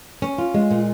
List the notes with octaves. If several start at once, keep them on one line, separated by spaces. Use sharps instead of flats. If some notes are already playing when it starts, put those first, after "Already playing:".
C#4
F4
G#3
A#2